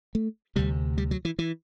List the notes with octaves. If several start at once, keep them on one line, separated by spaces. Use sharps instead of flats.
A3
D2 C3 G3
G3
F#3
E3
E3